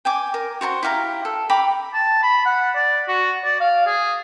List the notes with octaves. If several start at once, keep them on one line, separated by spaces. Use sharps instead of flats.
G5 G#5 D6
A#4
F#4 C5 A5 C#6
E4 G4 F5 A#5
A4
G5 A#5 B5 D6
A5
B5
F#5
D5
F#4
D5
F5
G#4